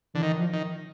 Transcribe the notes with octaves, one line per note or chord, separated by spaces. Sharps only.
D3 E3
D#3
F3
D#3